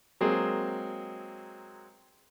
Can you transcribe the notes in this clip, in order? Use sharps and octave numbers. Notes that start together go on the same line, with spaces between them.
F#3 G#3 A#3 C4 G#4